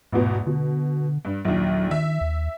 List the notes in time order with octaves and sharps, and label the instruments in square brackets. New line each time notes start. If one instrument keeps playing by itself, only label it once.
[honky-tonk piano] A1 E2 B2 [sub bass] G#2
[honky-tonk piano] B2 [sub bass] D3
[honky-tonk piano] G2
[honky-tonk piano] A#1 D#2 [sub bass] F#3
[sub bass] D#3 [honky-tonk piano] E5
[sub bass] D#2